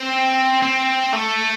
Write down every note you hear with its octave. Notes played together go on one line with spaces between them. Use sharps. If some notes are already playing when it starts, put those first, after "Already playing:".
Already playing: C4
C4
A3